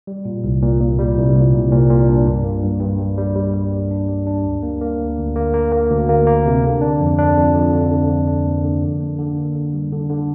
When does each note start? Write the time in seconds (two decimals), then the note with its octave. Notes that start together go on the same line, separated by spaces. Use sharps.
0.07 G3
0.25 A#2
0.44 C2
0.62 A#2
0.81 A#2
0.99 G3
1.16 C2
1.35 A#2
1.53 C2
1.72 A#2
1.90 A#2
2.08 D4
2.26 G2
2.44 A#3
2.63 G2
2.81 G2
2.99 G3
3.18 G3
3.35 G3
3.54 G3
3.72 A#3
3.91 D4
4.09 G3
4.27 D4
4.45 D2
4.63 A#3
4.81 A#3
4.99 D2
5.18 D2
5.36 A#3
5.54 A#3
5.72 A#3
5.91 D2
6.09 A#3
6.27 A#3
6.46 C3
6.64 D3
6.81 D4
7.00 F2
7.19 D4
7.37 F2
7.55 F2
7.73 D3
7.91 D3
8.09 F2
8.27 D4
8.46 A#3
8.64 D3
8.82 D3
9.00 A#3
9.19 D3
9.37 A#3
9.55 D3
9.73 G3
9.92 D3
10.10 D3